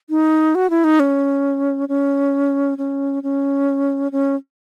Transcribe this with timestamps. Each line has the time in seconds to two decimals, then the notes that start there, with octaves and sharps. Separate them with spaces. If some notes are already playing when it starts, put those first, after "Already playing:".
0.10 D#4
0.55 F#4
0.70 E4
0.84 D#4
1.00 C#4
1.89 C#4
2.78 C#4
3.23 C#4
4.12 C#4